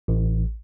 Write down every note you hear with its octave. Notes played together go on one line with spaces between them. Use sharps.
A1